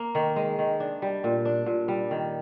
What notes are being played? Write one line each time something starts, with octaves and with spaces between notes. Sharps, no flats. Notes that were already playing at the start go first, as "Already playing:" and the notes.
Already playing: A#3
D#3
G#3
D#3
D4
G3
A#2
D4
A#2
G3
D#3